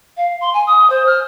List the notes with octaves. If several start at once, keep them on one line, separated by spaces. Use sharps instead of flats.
F5
C6
G#5
D#6
C5
F6